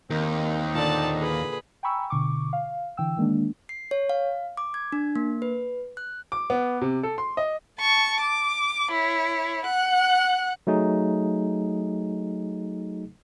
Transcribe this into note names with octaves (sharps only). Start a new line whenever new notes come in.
D#2 D#3 C4 D#4
A#2 D3 D5 A5
G#4 B4
G5 G#5 A#5 B5 C#6 E6
B2 D3 C#6 D6
F5
D3 E3 G5 E6
D#3 G#3 A#3 D4
C7
C#5
F5
D6
G#6
D4
A#3
B4
F#6
D6
B3
C3
A4
C6
D#5
A5 C#6
D6
E4 C#5
F#5 F#6
F#3 A3 D#4 G#4